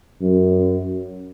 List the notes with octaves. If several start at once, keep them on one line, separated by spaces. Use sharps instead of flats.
F#2